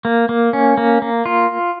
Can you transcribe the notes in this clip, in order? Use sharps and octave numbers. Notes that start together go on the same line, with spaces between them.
A#3
A#3
C#4
A#3
A#3
F4